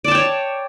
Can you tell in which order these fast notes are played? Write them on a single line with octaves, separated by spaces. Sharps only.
D5 A5 G5 C#5